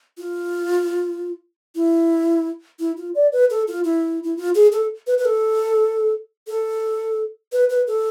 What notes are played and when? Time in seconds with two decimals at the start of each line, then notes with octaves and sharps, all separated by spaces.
0.18 F4
1.75 E4
2.79 E4
2.97 F4
3.15 D5
3.32 B4
3.50 A4
3.68 F4
3.84 E4
4.23 E4
4.37 F4
4.55 G#4
4.72 A4
5.07 B4
5.18 B4
5.25 A4
6.47 A4
7.52 B4
7.70 B4
7.87 A4